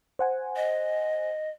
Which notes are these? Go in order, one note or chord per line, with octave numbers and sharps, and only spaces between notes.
C5 F#5 G#5
D#5